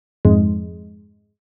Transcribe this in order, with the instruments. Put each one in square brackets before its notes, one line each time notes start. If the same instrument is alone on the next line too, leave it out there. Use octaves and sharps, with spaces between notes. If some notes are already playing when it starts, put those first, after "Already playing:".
[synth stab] F2 G#2 G#3